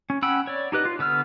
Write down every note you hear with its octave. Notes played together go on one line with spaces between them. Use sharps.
C#4
C#4 F#5 G5 B5 E6
C#5 D5
D#4 G4 B4 D#5
F4
D3 B3 E6 F6